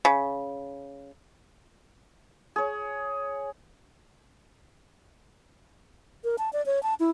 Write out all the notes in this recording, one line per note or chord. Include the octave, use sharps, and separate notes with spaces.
C#3
G#4 C#5
A#4
A5
D5
C#5
A5
E4